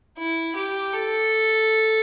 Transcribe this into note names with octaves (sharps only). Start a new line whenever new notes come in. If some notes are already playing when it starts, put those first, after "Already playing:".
E4
G4
A4